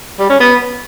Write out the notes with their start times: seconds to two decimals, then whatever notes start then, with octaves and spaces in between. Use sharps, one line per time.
0.19 G3
0.30 C#4
0.40 B3